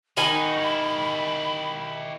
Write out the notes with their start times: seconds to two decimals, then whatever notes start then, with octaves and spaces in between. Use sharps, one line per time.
0.17 D#3 G#5 B5
0.33 D#4 F#4
0.57 E4 G4